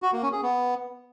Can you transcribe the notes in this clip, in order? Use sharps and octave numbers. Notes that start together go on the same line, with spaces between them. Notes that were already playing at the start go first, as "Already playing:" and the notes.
F#4
A#3
C#4
G#4
B3